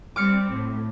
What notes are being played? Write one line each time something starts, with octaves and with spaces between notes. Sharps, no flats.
G3 C4 D6 F6 C#7
A2